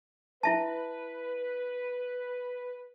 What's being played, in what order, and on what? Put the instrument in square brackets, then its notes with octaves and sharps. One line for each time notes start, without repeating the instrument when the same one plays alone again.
[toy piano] E4 E5 A5 [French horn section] B4